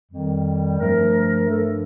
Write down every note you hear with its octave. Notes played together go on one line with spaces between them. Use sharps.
F2 D#3 G3
G2 F3 A3 A#4
G2 F3 A3 A4